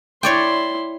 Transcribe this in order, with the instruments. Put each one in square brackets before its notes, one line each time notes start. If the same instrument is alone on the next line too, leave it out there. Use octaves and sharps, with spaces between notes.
[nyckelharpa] E4 C6 [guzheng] C#5 D5 G5